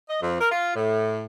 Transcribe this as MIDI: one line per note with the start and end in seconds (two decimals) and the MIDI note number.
0.10 0.18 75
0.22 0.39 41
0.40 0.50 70
0.52 0.73 65
0.76 1.23 45